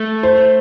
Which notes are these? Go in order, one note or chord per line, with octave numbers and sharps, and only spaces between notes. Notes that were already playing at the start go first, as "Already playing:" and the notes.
Already playing: A3
C5